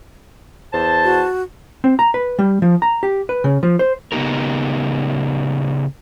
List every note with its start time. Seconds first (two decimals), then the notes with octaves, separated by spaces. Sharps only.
0.73 E2 C5 A5
1.04 F#4
1.84 C4
1.99 A#5
2.14 B4
2.39 G3
2.62 F3
2.82 A#5
3.03 G4
3.29 B4
3.44 C#3
3.63 F3
3.79 C5
4.12 C#3 B3 C4 D#4 G4 A#4